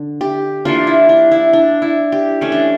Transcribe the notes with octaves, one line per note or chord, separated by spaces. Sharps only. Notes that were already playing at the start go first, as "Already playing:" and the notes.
Already playing: D3 D4
G4
E3 A#3 D4 F4
E4
D4
E4
D4
E4
G4
E3 A3 C#4
D4